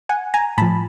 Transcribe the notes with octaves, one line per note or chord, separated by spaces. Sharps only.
F#5 G#5
G#5 A#5
A2 F3 A5 B5